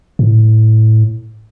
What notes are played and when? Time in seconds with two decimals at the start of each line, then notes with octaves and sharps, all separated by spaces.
0.19 A2